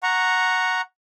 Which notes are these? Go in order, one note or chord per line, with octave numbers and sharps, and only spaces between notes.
F#5 A#5 C#6